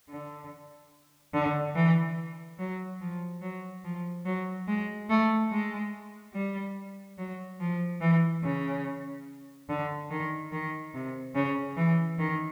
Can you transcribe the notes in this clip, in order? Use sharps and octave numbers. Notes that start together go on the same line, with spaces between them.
D3
D3
E3
F#3
F3
F#3
F3
F#3
G#3
A3
G#3
G3
F#3
F3
E3
C#3
D3
D#3
D#3
C3
C#3
E3
D#3